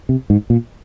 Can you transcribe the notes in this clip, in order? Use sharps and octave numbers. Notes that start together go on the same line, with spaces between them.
C3
G#2
A#2